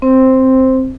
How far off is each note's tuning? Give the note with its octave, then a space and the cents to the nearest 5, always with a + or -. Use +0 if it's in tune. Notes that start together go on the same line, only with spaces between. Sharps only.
C4 +0 C5 +0